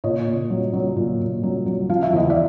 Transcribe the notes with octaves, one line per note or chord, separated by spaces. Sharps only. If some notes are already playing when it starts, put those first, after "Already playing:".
A#2 C#5 D#5
A#2
F#3
F#3
A#2
A#2
F#3
F#3
F3 F5
E5
E2 D#5
D5 E5